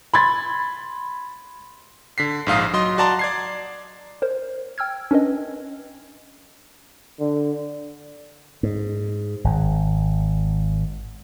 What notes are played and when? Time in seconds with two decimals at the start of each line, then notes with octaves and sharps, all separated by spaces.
0.14 B5 C6 G#6 A6
2.18 D3 B6 C7
2.46 A#1 G#2 F5 D#6
2.73 F#3 D#5 C6
2.98 F#4 D5 A5 A#5 C6
3.19 D5 G#6 C7
4.22 A#4 C5
4.78 G5 E6 F6 G#6
5.11 C#4 D4 A#4 B4 D#5
7.20 D3
8.63 G#2
9.44 G#1